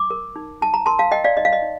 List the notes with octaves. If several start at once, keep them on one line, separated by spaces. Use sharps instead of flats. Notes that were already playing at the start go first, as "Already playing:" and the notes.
Already playing: D6
A#4
D#4
D#4 A5
A#5
A#4 A5 C6
F5 A5
A#4 D#5 G5
D5 F5
D#4 D#5
F5
D#5
D#4